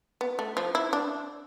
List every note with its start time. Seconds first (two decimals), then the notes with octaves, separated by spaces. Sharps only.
0.21 B3
0.39 A3
0.57 F3
0.75 E4
0.93 D4